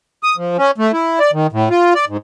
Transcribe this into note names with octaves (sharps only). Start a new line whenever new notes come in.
D#6
F3
C#4
A3
E4
D5
D#3
A2
F4
D5
G#2